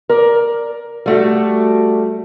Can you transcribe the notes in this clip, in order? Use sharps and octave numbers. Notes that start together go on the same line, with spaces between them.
A#4 D5
G3 A3 F#4